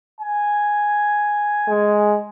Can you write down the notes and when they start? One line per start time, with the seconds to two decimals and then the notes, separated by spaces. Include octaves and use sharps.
0.20 G#5
1.68 G#3